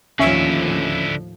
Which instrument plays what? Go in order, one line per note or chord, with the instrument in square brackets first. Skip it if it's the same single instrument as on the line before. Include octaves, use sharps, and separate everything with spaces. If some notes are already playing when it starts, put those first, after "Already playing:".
[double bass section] D#2 A2 F3 [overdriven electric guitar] D3 E4 [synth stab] C#4 E5